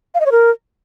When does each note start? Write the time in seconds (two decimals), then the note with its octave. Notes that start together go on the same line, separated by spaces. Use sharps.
0.14 F5
0.20 D#5
0.26 C#5
0.31 A#4